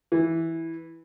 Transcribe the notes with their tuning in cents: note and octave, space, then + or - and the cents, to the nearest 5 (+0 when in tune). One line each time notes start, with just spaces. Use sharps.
E3 -5